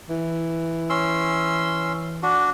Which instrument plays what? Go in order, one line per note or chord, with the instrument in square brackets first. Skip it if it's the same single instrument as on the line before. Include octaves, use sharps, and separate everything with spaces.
[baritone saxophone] E3
[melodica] C#4 C6 E6
D4 F#4